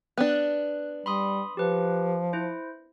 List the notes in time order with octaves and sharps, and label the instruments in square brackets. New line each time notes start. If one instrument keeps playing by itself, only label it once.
[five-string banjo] B3 D4 [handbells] F#6
[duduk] G3 [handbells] B5 C6 D#6
[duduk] F3 [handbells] G4 B4
[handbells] E4 C5